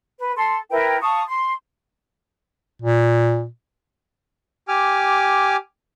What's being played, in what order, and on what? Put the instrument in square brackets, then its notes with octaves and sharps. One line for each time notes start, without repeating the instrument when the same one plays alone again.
[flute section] B4
A4 C6
E4 A#4 B4 G5
F5 A5 C#6 D#6
C6
[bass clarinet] A#2
[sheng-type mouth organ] G4 G#5 D6 F6